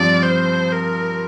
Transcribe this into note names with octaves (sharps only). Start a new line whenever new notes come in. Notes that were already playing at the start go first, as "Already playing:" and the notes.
Already playing: G2 F3 C4 D5
C5
A#4